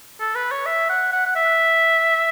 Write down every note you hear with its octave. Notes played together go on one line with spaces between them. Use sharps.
A4
B4
C#5
E5
F#5
F#5
F#5
E5